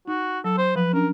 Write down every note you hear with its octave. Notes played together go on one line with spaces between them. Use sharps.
D#4 F#4
F#3 A4
C5
F3 B4
C#4 D4 A#4